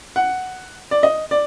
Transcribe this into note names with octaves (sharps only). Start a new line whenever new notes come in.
F#5
D5
D#5
D5